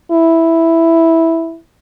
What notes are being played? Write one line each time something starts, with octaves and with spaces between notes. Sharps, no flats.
E4